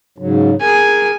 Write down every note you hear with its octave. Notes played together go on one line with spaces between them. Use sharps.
G#2 C#3 F#3
G#4 A#4 G#5